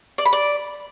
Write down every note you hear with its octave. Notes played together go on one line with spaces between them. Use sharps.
D5
B5
D5